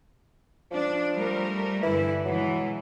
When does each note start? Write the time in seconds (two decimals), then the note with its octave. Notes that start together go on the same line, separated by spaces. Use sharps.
0.71 F3 D4
1.13 G3 A3 A#4
1.83 G2 D3 E3 E4
2.25 B2 E3 F#3 G#3